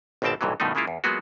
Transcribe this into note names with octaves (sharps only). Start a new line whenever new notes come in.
G#1 C#2 B2 C4 G5 A5
B1 G2 A#2 E3 F#3
G2 B2 D#3 F3 A3 D#4
C#3 G#3 A#3 E4 F4
E2
F#3 G#3 A#3 B3 F4 F#4